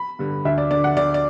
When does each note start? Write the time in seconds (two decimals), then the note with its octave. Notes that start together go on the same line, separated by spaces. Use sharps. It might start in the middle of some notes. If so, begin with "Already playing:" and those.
Already playing: B5
0.19 G2 D3
0.45 D2 E5
0.58 D5
0.71 D3 D5
0.84 F#5
0.97 D2 D5
1.14 D5